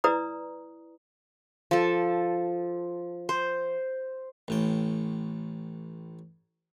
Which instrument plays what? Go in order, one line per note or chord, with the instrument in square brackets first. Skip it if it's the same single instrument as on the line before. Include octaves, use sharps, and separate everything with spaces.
[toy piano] E4 B4 D5 A#5 D#6
[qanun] F3 A4
C5
[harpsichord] A1 A2 G5